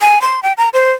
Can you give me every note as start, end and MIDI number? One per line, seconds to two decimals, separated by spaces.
0.01 0.21 80
0.21 0.40 84
0.43 0.53 79
0.57 0.69 82
0.73 0.92 72